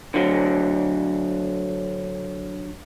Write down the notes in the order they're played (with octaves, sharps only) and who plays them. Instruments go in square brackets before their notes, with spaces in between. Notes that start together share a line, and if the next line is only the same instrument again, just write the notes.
[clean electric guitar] D3 F#3